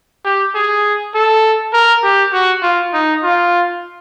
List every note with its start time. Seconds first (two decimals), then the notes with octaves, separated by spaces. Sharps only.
0.25 G4
0.55 G#4
1.14 A4
1.73 A#4
2.03 G4
2.33 F#4
2.63 F4
2.94 D#4
3.23 F4